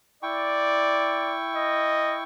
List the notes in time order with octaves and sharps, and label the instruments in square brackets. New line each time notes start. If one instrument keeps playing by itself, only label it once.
[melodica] E4 G5 C#6 [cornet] D5
[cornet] D#5